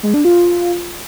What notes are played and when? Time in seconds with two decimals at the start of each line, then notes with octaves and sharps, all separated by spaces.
0.03 G#3
0.14 D4
0.25 F4